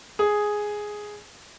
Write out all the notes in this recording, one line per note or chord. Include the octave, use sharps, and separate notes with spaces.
G#4